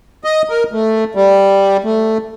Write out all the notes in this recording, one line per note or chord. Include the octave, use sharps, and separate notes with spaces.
D#5
A#4
A3
G3
A3